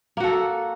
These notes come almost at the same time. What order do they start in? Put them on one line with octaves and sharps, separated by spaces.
A#3 F#4 A4